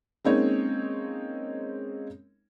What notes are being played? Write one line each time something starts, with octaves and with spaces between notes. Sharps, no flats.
G#3 A#3 C4 C#4 D#4 C#5